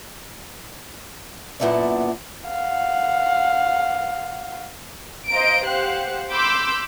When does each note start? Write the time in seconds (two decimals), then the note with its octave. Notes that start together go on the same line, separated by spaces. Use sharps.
1.60 F#2 A#2 B3 E4 A4 D5
2.48 F5 F#5
5.29 C5 D#5 F5 A#5 D7
5.66 G4 C5 F5 F#5 F#6
6.31 B5 C6 D6 E6 G6